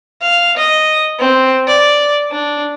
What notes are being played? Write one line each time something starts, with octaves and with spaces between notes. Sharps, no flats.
F5
D#5
C4
D5
D4